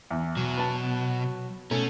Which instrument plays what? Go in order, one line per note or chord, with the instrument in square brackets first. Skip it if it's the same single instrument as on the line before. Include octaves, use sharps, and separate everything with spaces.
[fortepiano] E2
[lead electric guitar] B2 [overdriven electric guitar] F#3
[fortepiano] B3 A5
[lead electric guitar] B2 [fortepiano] A3 [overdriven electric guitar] C#4